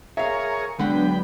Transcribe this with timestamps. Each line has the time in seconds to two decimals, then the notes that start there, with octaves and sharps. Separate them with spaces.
0.17 G#4 A#4 C#5 E5 F5
0.79 D3 F#3 G#3 B3 D4 F#5 G5 B5